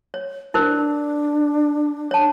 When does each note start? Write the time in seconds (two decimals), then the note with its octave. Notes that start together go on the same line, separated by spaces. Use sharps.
0.14 C#5
0.54 D4 E4 A#4 C5
2.11 C#5 A5